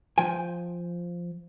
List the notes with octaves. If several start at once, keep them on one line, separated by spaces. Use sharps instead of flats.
F3 G5 G#5